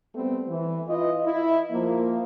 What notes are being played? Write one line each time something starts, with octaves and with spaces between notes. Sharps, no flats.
G3 A3 B3 C4
E3
E4 F4 B4 D#5
E4
F3 A#3